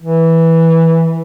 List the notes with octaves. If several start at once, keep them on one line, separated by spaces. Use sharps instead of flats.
E3